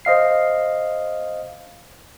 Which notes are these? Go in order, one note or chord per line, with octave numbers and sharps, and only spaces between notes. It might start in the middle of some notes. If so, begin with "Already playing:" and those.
C5 D#5 F5 C7